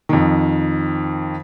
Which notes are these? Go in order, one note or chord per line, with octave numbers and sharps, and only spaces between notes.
F2 D#3